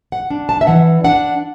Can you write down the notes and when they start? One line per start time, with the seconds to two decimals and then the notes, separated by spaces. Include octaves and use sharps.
0.12 F#5
0.30 D4
0.49 A5
0.61 E5
0.67 E3 F#5
1.04 D4 F#5